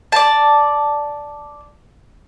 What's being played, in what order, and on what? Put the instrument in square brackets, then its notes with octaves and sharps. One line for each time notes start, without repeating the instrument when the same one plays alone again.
[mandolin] D5 A5